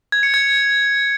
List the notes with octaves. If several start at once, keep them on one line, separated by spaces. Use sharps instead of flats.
G#6
C#7
G#6